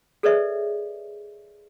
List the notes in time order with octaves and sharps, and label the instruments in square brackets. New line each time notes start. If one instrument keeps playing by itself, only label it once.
[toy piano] G#4 A4 B4 C#5 D5 E5